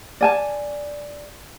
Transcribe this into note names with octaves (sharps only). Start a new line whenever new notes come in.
D5 G#5 A5